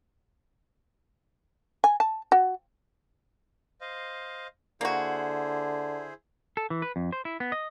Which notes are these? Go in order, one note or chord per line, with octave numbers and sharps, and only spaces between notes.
G#5
A5
F#4
C5 D#5 F5
D3 A#3 E4 F#4 G#4 C5
A4
E3
B4
F2
C5
E4
B3
D#5